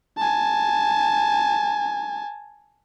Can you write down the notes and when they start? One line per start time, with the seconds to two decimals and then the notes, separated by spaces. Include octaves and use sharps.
0.17 G#5 A5